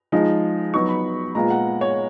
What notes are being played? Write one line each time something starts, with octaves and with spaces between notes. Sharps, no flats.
F3 G#3 D#4
F#3 B3 D#4 C#6
B5
A#2 G#3 B3 F4 A#5
F#5
C#5